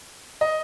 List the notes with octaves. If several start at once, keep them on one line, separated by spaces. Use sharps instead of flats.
D#5